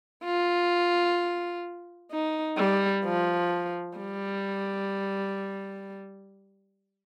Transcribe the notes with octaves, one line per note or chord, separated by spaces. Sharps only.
F4
D#4
G3
F3
G3